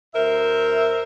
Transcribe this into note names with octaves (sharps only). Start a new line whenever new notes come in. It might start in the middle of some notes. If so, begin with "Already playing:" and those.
D2 A#4 C5 E5